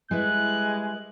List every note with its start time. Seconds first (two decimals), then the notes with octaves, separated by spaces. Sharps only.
0.11 G3 G#3 E4 B4 F#6